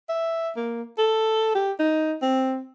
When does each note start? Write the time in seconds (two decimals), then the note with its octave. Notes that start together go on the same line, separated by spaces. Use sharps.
0.09 E5
0.57 A#3
0.98 A4
1.55 G4
1.80 D#4
2.22 C4